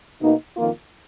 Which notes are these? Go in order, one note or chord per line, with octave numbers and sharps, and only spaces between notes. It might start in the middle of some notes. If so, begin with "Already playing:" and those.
B2 A#3 D#4
F2 D#3 A#3 F4